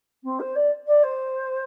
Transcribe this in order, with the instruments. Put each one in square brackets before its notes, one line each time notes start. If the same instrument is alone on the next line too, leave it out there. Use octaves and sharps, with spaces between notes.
[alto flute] C4
C5
D5
D5
C5